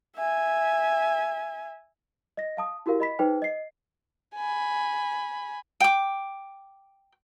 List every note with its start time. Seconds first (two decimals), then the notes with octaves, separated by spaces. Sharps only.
0.17 E5 G#5
2.37 D#5 A#6
2.57 F5 A5 D#6
2.86 E4 F#4 G4 A#4 F5
3.00 D#5 B5 B6
3.19 D#4 G#4 B4 C5 G5
3.42 D#5 C7
4.35 G#5 B5
5.80 G5 D6